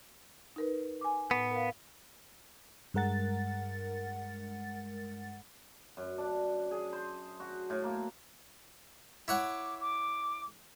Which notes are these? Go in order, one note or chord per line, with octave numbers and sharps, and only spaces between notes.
D#4 A#4 B4
G#5 D6
A2 B3
A#4 F5
G2 G#3 A#4 F#5 A6
F#2
D4
G#4
C5
F#4
A2
A#3
E4 C#5 F#5 D6
D6